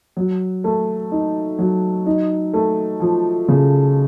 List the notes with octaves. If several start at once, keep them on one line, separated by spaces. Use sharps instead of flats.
F#3
A3
D#4
F#3
D#4
A3
F3
C#3